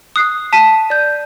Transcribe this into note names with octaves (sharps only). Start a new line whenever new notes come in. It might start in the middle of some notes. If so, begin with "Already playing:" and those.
D#6 F#6 C7
A5 B6 D#7
D5 G6